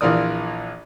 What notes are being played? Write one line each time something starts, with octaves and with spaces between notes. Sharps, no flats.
A#1 E3 F4 A#4 D5 D#6